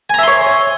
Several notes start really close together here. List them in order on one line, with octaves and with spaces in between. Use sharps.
G#5 A#5 E5 C6 C#5